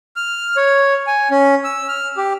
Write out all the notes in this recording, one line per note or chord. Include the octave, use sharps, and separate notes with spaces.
F6
C#5
G#5
C#4
E6
F6
G4